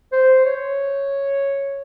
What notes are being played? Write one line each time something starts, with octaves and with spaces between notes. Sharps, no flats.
C5
C#5